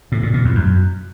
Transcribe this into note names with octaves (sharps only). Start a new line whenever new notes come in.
A2
A#2
A#2
E2
F#2